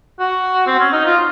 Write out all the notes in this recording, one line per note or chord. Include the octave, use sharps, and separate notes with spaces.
F#4
C4
C#4
D#4
F4